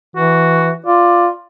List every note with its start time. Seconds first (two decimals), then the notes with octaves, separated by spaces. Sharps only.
0.16 E3 F#4
0.86 F4 D5